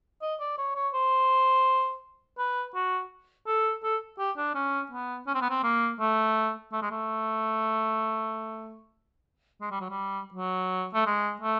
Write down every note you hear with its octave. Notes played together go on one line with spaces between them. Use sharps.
D#5
D5
C#5
C#5
C5
B4
F#4
A4
A4
G4
D4
C#4
B3
C#4
C4
B3
C4
A#3
A3
A3
G#3
A3
G#3
G3
F#3
G3
F#3
A3
G#3
A3